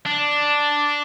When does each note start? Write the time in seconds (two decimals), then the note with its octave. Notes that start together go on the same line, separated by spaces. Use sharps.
0.06 D4